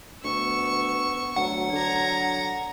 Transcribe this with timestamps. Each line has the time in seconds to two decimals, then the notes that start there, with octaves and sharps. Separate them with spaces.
0.24 D2 B3 C#6 E6
1.36 D2 F#3 F#5
1.73 D3 A#5 G#6